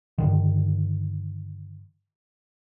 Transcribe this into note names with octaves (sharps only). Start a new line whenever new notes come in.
G2 D3 D#3